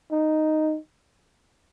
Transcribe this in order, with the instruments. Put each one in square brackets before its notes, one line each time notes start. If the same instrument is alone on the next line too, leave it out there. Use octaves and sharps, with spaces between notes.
[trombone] D#4